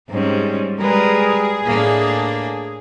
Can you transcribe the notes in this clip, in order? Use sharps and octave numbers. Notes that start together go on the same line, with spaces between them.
G#2 G3 C4 C#4
G3 G#3 G#4 A#4 B4
A2 A#3 D4